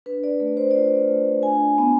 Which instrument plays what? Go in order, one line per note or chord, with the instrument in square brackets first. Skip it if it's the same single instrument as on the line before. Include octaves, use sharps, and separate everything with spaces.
[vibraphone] D4 B4
D5
A3 D5
C5
D5
F4 C5
A3
D4 G#5
B3